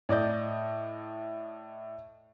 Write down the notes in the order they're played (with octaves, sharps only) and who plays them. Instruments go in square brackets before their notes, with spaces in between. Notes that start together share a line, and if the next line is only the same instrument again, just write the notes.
[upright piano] A2 D5 D#5 G6